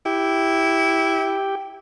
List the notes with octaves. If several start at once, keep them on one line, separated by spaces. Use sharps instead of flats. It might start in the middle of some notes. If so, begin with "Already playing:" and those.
E4 G4 G5